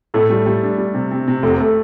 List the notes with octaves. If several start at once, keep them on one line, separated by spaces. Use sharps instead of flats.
A2 A3
G3
G3
D4
G3
C3
C3
C3
F1 A3
A3